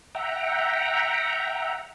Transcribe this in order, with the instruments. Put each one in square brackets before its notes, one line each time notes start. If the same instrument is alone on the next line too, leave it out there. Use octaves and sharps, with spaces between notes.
[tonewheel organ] E5 F#5 G5 A#5